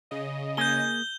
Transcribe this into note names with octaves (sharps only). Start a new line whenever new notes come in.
C#3 D#5
A#3 G#4 G#5 G6 G7